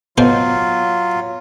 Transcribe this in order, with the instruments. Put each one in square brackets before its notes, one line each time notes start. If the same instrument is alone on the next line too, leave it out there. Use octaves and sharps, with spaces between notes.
[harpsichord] B2 C5 [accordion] F#3 F4